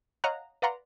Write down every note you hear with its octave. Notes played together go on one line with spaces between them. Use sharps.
C#5 D#5 F5 F#5 A#5 F#6
B4 D5 F5 F#5 A#5 C6